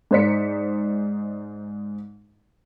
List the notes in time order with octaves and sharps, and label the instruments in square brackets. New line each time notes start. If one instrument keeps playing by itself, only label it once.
[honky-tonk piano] G#2 D#4 C5 D5 B6 C#7